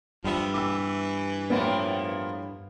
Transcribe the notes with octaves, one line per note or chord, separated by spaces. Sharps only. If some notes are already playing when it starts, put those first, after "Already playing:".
G2 F3 G3 B3 E5
E3 D6 E6
A2 F3 A#3 B3 C#5